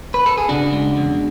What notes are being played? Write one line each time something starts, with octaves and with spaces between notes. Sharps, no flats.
B4
A4
G#4
C#3 D4 F#4
G#3
E2